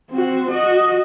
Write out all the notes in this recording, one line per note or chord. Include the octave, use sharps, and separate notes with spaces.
C4 F#4
F#4 D#5